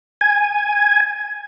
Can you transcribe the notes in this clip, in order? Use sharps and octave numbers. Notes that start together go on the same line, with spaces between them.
G#5